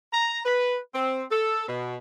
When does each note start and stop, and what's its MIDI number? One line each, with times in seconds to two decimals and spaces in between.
0.13 0.39 82
0.45 0.77 71
0.94 1.23 60
1.31 1.65 69
1.67 1.97 47